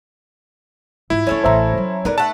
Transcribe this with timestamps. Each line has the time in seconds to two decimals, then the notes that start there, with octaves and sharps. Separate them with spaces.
1.10 G#2 E4 F4
1.27 F3 B3 C#4 A4 C#5
1.44 A1 B3 C5 E5 A#5
1.77 F#3
2.05 D3 B3 D#4 A#4 B4
2.18 A3 F#5 A5